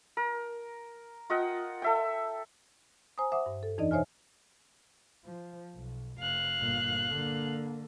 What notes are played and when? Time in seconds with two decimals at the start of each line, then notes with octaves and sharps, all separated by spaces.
0.17 A#4
1.30 F4 D#5 F#5 G5
1.82 A4 E5 G5
3.18 C5 G#5 A#5 D#6
3.32 C5 E5 F#5 D6 D#6
3.46 G2
3.63 A4
3.78 F2 E3 D4 D#4 D5 D#5
3.91 B2 C5 C#5 E5 G#5 F6
5.25 F3
5.75 B1
6.20 F1 F5 F#6
6.59 G1 A#2
7.09 D3 A#3